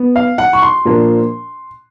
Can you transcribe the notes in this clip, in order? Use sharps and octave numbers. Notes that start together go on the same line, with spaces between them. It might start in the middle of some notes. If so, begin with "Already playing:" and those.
Already playing: B3
F5
F#5
C#6
C6
A#2 F3 A#3 D4